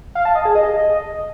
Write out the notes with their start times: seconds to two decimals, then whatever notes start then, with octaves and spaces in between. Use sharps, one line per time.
0.15 F5
0.25 A5
0.35 D#5
0.45 G#4
0.55 D#5